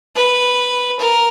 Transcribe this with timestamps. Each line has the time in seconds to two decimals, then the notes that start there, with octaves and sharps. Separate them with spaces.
0.15 B4
0.99 A#4